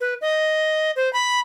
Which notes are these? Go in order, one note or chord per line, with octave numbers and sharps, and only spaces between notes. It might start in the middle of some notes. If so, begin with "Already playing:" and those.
B4
D#5
C5
B5